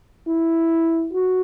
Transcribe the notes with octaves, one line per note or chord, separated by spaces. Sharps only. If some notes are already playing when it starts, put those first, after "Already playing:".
E4
F#4